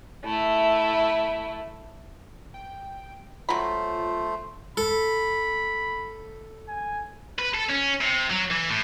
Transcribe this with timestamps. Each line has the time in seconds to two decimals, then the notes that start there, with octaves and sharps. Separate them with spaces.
0.25 A3 E4
2.54 G5
3.49 F#3 A3 F4 C5 B5
4.77 A4 B5
6.68 G#5
7.39 B4
7.54 A4
7.69 C#4
8.01 C3
8.30 F#3
8.51 E3
8.70 A2